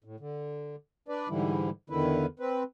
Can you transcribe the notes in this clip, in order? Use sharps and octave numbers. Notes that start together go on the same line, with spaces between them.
A2
D3
D4 B4 D5
G#2 D3 E3 G3 E4
E2 D3 D#3 E4 B4
C4 B4